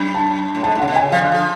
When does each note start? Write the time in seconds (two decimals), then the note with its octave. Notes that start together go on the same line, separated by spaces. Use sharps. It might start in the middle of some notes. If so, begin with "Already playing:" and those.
Already playing: F#2
0.14 A5
0.55 A2
0.63 G#2 A5
0.75 A2
0.80 C#3 F#5
0.88 B2
0.96 G#5
1.00 C#3
1.12 F3 F5
1.21 D3
1.32 F3